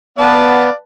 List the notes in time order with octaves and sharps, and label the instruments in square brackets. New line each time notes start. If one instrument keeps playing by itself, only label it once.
[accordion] B3 [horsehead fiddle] B4 A5 [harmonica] D5 F5